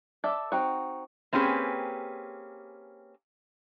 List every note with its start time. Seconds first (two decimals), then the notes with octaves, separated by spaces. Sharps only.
0.24 A4 D5 E5
0.52 C4 D#4 F#4
1.33 A#3 C4 C#4 G4 G#4 B4